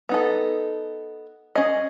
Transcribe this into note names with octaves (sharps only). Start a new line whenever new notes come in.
B3 D#4 A4
C#4 G#4 D#5